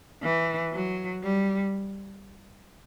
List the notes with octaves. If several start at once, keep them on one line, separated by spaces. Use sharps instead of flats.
E3
F#3
G3